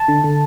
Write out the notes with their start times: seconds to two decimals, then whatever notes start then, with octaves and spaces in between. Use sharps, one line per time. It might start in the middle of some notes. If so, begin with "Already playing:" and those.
Already playing: A5
0.08 D3
0.24 D3